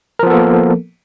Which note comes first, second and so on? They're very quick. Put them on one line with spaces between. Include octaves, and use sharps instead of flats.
A#4 F3 B3 A4 A#3